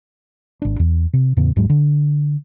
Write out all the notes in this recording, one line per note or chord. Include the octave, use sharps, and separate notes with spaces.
G#1 D4
E2
C3
E2 A2 C#3 B3
D#1 G#2 F#3 G#3
D3